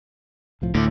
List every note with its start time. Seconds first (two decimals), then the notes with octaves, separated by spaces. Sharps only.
0.62 C2 A2 F3
0.75 D2 A2 D3 A3